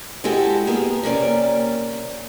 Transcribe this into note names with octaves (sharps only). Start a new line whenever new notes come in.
G#3 E4 F#4 G4 A4
A#3 B3 G4 G#4
C3 A#3 C#4 D5